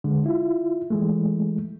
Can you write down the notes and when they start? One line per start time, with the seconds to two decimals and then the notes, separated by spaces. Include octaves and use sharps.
0.04 D3 G#3
0.26 E4 F4
0.90 E3 G#3 A3